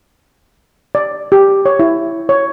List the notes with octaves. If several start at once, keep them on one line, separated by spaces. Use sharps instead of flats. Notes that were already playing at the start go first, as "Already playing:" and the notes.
D5
G4
C#5
E4
C#5